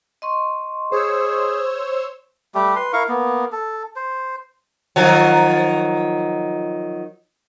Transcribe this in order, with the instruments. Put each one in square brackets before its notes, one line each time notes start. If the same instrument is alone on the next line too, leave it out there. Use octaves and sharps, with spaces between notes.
[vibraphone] D#5 C6 C#6
[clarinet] G#4 [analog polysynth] C5 C#5 E6
[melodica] G3 A3 G4
B4 C6
E4 A#4 F5 C#6
A#3 B3
A4
C5
[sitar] D#3 F3 F#3